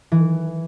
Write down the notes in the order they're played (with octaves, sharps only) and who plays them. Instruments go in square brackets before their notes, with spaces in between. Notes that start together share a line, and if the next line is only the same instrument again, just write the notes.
[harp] E3